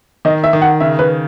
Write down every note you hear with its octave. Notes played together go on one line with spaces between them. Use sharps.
D#3 D#5
E5
D#3
F#5
C#3 E5
B4